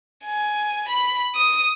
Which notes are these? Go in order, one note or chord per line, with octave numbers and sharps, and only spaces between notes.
G#5
B5
D#6